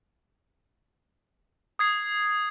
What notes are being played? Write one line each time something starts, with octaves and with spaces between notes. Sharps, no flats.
D#6 G#6 C7